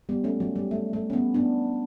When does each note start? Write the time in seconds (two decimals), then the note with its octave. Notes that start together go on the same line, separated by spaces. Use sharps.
0.09 G3 B3
0.24 A3 C#4
0.40 F#3
0.56 G3
0.71 A3
0.93 A3
1.10 C#4
1.13 G3 B3
1.34 B3 D4